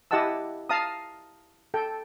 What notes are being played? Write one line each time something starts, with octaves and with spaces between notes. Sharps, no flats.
E4 G4 D#5 F#5 A5 E6
F5 A5 A#5 D#6
A4 G5